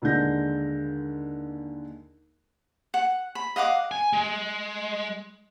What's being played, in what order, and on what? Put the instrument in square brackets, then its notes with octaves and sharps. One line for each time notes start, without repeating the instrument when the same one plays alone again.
[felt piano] D#2 D3 G#3 G6 A#6
[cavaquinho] F#5
B5
D#5 F5 F#5 D6
[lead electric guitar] G#5
G#3